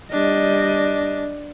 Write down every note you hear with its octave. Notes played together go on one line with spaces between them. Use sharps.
G3 D4 D#5